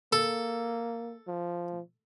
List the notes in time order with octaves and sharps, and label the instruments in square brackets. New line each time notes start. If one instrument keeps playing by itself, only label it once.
[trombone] A#3 [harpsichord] A4
[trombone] F3